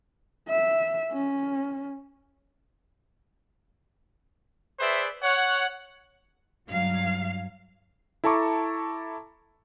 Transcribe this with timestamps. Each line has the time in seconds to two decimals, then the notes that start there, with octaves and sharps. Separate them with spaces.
0.49 E5
1.12 C#4
4.80 G#4 B4 C5 D5 E5
5.22 C#5 F#5
6.70 G2 F#3 F5
8.24 E4 A4 A5 A#5 C#6 D6